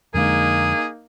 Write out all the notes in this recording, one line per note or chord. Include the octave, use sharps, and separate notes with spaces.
F2 D3 G#3 A#3 D#4 G#4